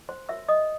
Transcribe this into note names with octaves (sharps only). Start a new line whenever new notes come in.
C5 C6
F#4 A#4 C#5 E5 E6
D#5 D#6